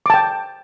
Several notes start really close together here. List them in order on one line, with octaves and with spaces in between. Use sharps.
D6 A5 G5